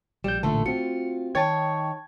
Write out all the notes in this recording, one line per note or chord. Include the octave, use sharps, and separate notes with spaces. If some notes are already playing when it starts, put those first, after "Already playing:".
A#1 G3 G6 E7
A1 A#2 D3 A3 A5
C4 F4 F#4 C#7
D#3 C#5 G5 A5 G#6 A6